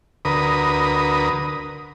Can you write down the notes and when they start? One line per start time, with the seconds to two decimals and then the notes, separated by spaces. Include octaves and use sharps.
0.25 D2 A#4 B4 D#6